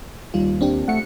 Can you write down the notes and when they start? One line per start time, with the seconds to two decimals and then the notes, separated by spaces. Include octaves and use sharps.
0.34 D#2 G3 F4
0.61 C4 D4 G4
0.88 A3 F#5 C#7